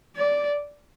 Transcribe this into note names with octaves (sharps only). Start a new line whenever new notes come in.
D5